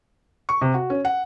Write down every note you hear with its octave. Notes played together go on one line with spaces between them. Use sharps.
C#6
C3
F#4
C#4
F#5